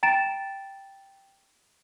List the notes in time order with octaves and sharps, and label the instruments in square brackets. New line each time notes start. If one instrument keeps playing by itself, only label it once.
[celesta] G5 A#5 A6 D7 E7